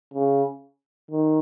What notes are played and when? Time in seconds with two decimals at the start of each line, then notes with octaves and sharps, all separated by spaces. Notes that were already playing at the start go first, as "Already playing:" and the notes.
0.13 C#3
1.11 D#3